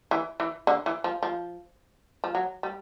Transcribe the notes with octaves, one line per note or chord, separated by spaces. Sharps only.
E3
E3
D3
E3
F3
F3
F3
F#3
G3